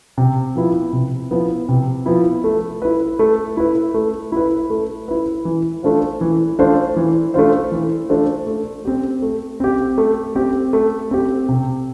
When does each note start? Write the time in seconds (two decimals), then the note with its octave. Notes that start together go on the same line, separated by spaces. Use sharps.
0.18 C3
0.56 F3 B3 E4
0.93 C3
1.31 F3 B3 E4
1.69 C3
2.06 F3 B3 E4
2.44 A3
2.82 E4 B4
3.19 A3
3.57 E4 B4
3.94 A3
4.32 E4 B4
4.70 A3
5.08 E4 B4
5.45 E3
5.83 A3 D4 F4 C5
6.21 E3
6.59 A3 D4 F4 C5
6.96 E3
7.34 A3 D4 F4 C5
7.72 E3
8.09 A3 D4 F4 C5
8.47 A3
8.85 C4 G4
9.22 A3
9.60 C4 G4
9.98 A3
10.35 C4 G4
10.73 A3
11.11 C4 G4
11.49 C3